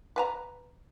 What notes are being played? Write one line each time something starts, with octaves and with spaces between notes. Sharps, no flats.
B4 G#5 A#5